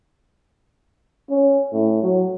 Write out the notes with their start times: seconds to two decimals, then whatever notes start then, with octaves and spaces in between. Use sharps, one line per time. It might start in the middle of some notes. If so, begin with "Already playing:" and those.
1.30 C#4
1.72 A2
2.02 F#3